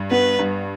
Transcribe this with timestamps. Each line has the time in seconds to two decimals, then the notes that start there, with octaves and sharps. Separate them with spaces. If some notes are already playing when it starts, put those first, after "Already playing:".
Already playing: G2
0.11 B3 B4
0.39 G2